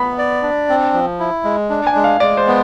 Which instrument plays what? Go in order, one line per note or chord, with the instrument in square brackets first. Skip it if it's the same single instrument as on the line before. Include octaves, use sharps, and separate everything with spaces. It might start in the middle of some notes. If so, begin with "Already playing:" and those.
Already playing: [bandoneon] B3 [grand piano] B5
[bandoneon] D5
D4
C4
F3
E4
G#3
D4
[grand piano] G#5
[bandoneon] G#3
[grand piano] F5
[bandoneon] G#3 [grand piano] D5
[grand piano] C5
[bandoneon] B3